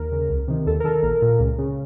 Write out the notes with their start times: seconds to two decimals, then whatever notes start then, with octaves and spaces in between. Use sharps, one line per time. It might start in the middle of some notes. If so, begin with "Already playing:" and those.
Already playing: D#2 A#4
0.12 C#3
0.29 C#2
0.48 C3 D#3
0.66 D#2 A4
0.80 A#4
0.84 D#3 A4
1.03 A#1 A#4
1.22 A#2
1.39 C#2
1.58 C#3